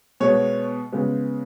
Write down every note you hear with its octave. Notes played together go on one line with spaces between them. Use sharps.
B2 G#3 B3 C#5
C#3 G#3 B3